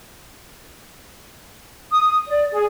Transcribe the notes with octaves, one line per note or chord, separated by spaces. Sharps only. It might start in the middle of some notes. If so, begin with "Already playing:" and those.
D#6
D5
G#4